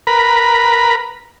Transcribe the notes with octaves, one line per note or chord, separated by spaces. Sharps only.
A#4 B4 B5